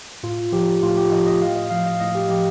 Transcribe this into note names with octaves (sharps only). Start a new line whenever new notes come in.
A2 F4
F3 G4
A2 F4
G4
F3 D#5
D#5
A2 F5
D#5
F3 F5
D#5
A2 D#5
G4
F3 G4